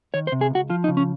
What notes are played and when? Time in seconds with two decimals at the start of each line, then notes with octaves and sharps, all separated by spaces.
0.14 D#3 C#5
0.27 C5
0.32 C3
0.41 G#4
0.50 C#2 F#4
0.70 F3 F4
0.84 D#4
0.88 C#3
0.97 C#4